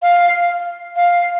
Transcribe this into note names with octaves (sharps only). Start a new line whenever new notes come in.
F5
F5